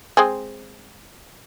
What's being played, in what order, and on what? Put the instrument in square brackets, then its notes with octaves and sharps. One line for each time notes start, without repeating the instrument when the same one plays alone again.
[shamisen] G#3 C4 G#4